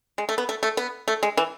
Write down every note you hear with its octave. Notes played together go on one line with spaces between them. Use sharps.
G#3
A3
B3
A3
A3
B3
A3
G#3
E3